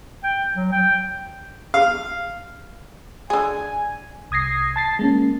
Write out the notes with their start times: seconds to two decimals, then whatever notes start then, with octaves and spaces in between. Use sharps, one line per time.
0.24 G5
0.56 F#3
0.72 G5
1.74 F5
3.30 D3 G#4 G#5
4.31 C2 D#6 G#6 A#6 C7
4.76 A5 A6 C7
4.99 G#3 A#3 C#4